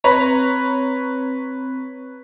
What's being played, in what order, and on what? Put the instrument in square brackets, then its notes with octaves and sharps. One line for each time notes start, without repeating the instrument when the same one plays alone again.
[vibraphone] C4 [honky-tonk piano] B4 C#5 A#5